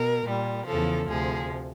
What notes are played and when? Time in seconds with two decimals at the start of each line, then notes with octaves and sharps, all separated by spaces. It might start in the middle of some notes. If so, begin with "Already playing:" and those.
Already playing: B2 A#4
0.25 A#2 G3
0.66 E2 C#3 F3 A4
1.08 D2 C3 F3 G#4